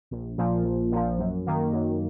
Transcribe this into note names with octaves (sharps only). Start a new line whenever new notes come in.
A#1
A#2 F3
A#1
A#2 F3
F#2
D#3 A#3
F#2